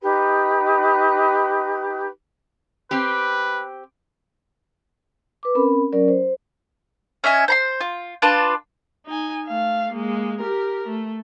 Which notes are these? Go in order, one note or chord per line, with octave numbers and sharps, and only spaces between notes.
D#4 G4 B4
C4 G4 B4
B4 D6
C4 C#4 A#4 B5
F#3 C#4 A#4 D5
C5
C#4 D#5 E5 G#5
C5 A#5 C6
F4
D4 F4 B4 A5
D#4 G#5
A3 F5
G#3 A#3
G4 A#4
A3